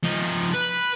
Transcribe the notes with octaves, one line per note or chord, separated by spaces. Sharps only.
F3 D#4
B4